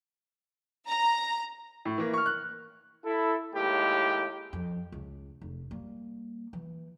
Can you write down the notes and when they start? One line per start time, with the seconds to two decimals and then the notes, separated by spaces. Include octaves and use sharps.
0.87 A#5
1.85 A2
1.98 E3 A#3
2.13 C#6 F6
2.26 F#6
3.05 E4 A4
3.54 D#2 A2 G#3 G4
4.53 F2
4.92 C#2
5.41 F1
5.71 G3 A#3
6.53 E3